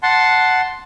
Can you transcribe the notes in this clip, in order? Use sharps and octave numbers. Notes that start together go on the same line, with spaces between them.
F#5 A5 C6